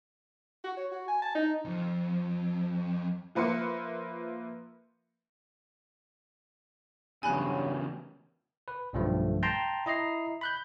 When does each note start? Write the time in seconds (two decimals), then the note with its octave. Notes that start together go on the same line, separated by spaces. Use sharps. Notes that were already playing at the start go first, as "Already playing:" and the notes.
0.64 F#4
0.77 C#5
0.92 F#4
1.08 G#5
1.22 A5
1.35 D#4
1.65 F2
3.35 F3 A#3 B4 E5 C6 C#7
7.23 E2 G2 C#3 F#3 G#5 B5 F#6
8.68 B4
8.93 B1 G2 D3 F3 A3
9.43 G5 A5 A#5 C6
9.86 E4 D#5 A#5 C7
10.41 B5 F#6 G6